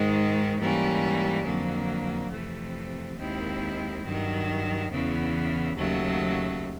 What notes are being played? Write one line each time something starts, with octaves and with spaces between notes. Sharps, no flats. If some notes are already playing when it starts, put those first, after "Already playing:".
Already playing: G#2 D#3 G#3
G#2 E3 G3 A#3 C#4
F2 D3 F#3 A#3
F2 C3 E3 A3
D#2 D#3 G#3 C4 E4
G2 D#3 F#3
E2 C#3 E3
D#2 C#3 F#3 A3